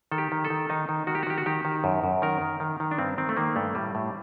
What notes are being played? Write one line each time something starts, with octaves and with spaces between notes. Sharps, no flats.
D#3 A4
G4
D#3
A4
D#3
D#3 D#4
D#3
D#3 F#4
G4
F#4
D#3 G4
F#4
D#3 G4
D#3
F#2
F#2
D#3 A#4
D#3
D#3
D#3
D4
G2 C4
D#3 C4
A3
D#3 A#3
G2 A3
A2 G3
A2